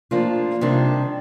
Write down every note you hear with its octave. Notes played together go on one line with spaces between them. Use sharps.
F3 A#3 D4 F4
C3 D#3 G3 D4